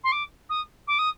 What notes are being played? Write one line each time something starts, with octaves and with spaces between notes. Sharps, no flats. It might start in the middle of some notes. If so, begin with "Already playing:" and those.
C6
D6
D#6
D6
D#6